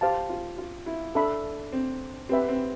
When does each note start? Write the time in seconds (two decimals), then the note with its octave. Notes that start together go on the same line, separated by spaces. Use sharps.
0.01 G4 C5 F5 A5
0.29 F4
0.58 F4
0.86 E4
1.15 D4 A4 E5 B5
1.73 C4
2.29 C4 G4 B4 E5
2.49 C4